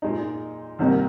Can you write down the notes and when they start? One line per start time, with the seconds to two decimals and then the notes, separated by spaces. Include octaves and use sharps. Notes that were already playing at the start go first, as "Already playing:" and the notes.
0.02 A#2 G#3 D#4
0.79 C2 C3 D#3 A#3 D#4